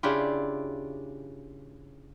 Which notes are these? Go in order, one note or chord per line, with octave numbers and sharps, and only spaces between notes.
C#3 D4 E4 F4 G4